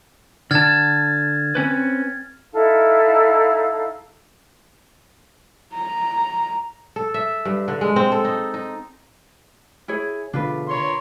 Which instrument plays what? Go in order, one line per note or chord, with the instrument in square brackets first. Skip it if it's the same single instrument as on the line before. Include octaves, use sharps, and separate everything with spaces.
[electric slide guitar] D3 A5 [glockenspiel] F6 G#6 A6
[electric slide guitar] C4 C#4 B4
[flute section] D#4 E4 A4 F5
[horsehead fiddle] A#5
[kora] A4
E5
G2
D3
G#3
C4
A4
D#4
D#4
[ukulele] E4 G#4 C#5
[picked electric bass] B2 D3 [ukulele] D4 F4 B4
[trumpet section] A#4 C#5 [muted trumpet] C6